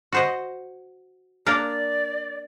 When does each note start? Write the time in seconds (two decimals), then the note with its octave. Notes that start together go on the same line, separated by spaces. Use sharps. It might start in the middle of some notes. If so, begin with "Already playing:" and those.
0.12 F#4 C5 D#5
1.46 A#3 D4 A#4 D5